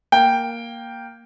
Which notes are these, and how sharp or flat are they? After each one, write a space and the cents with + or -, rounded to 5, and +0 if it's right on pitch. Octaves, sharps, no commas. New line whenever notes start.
A#3 +0 G5 +0